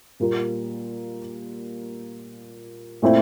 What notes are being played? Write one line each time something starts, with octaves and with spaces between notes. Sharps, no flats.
A#2 G3 A#3 F4 A#4
A#2 A3 C4 E4